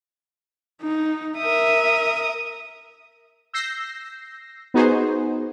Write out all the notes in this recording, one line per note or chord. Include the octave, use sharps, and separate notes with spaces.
D#4
A#4 E5 D#6
E6 G6 A#6 C7
B3 D#4 F#4 G#4 C5